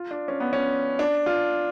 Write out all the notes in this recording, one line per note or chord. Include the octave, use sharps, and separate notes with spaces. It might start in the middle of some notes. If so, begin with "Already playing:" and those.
Already playing: F4
D4
C#4
B3
C#4
D4
F4